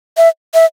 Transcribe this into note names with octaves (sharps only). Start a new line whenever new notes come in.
E5
E5